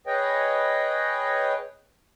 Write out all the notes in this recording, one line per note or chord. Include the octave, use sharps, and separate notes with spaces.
G#4 B4 C#5 D#5 G5